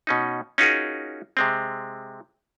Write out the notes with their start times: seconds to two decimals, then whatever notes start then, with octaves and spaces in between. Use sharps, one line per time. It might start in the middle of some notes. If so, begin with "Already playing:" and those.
0.07 B2 C#4 D#4
0.58 C#4 D#4 F4 F#4 G#4 A#4
1.37 C3 G#3 C4